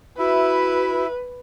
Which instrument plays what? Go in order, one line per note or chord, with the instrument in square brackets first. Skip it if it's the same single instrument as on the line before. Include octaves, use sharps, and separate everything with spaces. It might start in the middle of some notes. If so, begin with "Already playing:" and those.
[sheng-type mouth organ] E4 E5 [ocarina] F#4 [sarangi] B4